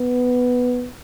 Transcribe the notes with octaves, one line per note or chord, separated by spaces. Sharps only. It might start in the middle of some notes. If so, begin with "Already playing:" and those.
Already playing: B3